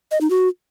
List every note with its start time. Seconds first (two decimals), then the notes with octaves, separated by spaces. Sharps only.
0.11 D#5
0.21 D#4
0.30 F#4